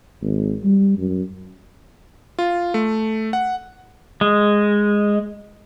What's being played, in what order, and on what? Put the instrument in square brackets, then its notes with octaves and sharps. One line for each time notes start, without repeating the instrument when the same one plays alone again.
[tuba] G#1
G3
F#2
[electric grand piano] F4
A3
F#5
[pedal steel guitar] G#3